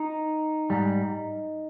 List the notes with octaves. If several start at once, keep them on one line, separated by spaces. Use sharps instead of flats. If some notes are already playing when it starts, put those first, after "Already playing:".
Already playing: D#4
G#2 G3